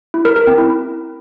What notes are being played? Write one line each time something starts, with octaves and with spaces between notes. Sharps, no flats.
E4
A#4
A#4
C4
E4